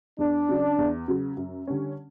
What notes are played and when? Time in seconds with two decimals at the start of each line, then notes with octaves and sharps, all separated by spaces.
0.18 E2 D4
0.49 C#3 F#3
0.78 E2
1.08 C#3 F#3
1.37 F#2
1.67 D3 G3 C#4